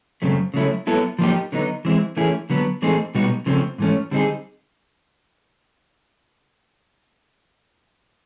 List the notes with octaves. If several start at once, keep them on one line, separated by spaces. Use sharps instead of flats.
F#2 C#3 F#3 A3 C4
C#3 F#3 A3 C#4 E4
F#3 B3 E4 A4
F3 A#3 D#4 G4
D3 F#3 B3 D#4
E3 G#3 C4 E4
E3 A3 C#4 E4 G#4
D3 F#3 B3
E3 A3 C4 D#4 G#4
B2 G3 B3 D#4 F#4
C#3 F3 A3 C4
G#2 E3 A3 C#4
D3 G3 C4 D#4 G#4